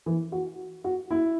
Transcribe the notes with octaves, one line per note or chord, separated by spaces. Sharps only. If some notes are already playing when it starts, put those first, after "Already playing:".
E3
F#4
F#4
E4